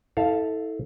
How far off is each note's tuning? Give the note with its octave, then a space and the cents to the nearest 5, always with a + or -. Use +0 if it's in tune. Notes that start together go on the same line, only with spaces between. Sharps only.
E4 -40 A4 +0 F5 +0